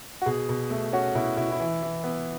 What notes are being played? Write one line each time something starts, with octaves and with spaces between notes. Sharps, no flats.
F#4
B2 G#4
B2
A3
C#4 F#4
B2 E4
B2 E4
E4
E3
E3
B3